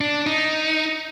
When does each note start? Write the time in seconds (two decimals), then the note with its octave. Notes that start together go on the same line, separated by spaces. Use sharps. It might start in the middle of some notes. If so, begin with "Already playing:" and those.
0.01 D4
0.27 D#4